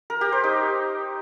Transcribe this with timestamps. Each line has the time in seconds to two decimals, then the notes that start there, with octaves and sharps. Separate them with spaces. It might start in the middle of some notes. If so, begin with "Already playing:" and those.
0.10 A#4
0.21 G4
0.32 C5
0.44 D#4